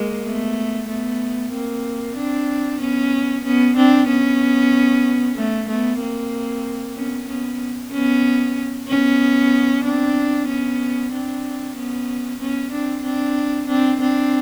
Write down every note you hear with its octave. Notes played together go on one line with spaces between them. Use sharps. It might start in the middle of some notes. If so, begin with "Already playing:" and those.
Already playing: G#3 A#3
A3 B3
A3 B3
A#3 C4
C4 D4
B3 C#4
B3 C#4
C4 D4
B3 C#4
A3 B3
A3 B3
A#3 C4
B3 C#4
B3 C#4
B3 C#4
B3 C#4
C4 D4
B3 C#4
C4 D4
B3 C#4
B3 C#4
C4 D4
C4 D4
C4 D4
C4 D4